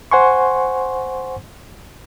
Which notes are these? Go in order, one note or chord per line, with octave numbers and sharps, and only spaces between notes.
C5 F#5 G#5 C6 C#6